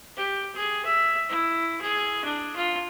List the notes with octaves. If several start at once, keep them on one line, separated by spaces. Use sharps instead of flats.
G4
G#4
E5
E4
G#4
D4
F4